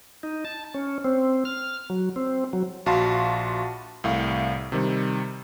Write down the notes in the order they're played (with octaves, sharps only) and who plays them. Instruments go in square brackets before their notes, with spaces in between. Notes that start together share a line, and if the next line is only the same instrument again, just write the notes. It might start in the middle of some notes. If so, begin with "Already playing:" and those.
[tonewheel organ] D#4
A5
C#4
C4
F6
F#3
C4
F#3
[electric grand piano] A#1 F#4 F5 A5 B5 C6
C2 A2 F5
C3 D#3 G3